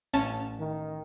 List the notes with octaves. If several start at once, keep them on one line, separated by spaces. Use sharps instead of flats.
A1 C#4 A5
D#3